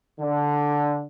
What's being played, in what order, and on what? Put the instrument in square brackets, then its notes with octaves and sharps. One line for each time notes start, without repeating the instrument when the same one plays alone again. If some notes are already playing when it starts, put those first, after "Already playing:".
[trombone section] D3